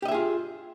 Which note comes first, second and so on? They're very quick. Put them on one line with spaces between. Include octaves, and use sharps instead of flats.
G4 D#5 E5 G#4 F4